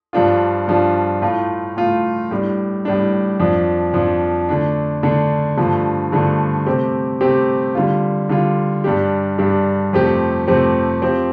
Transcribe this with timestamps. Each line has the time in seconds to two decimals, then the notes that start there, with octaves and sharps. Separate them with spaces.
0.13 G2 F3 D4 F4
0.68 G2 F3 D4 F4
1.22 A2 A3 F4
1.76 A2 A3 F4
2.31 A2 G3 D4
2.85 A2 G3 D4
3.40 F2 F3 D4
3.94 F2 F3 D4
4.49 D3 A3 D4
5.03 D3 A3 D4
5.57 G2 D3 F3 A3
6.12 G2 D3 F3 A3
6.66 C3 A3 C4 G4
7.21 C3 A3 C4 G4
7.75 D3 G3 F4
8.29 D3 G3 F4
8.84 G2 G3 D4 G4
9.38 G2 G3 D4 G4
9.93 F2 C3 A3 C4 G4
10.47 F2 C3 A3 C4 G4
11.02 F3 C4 G4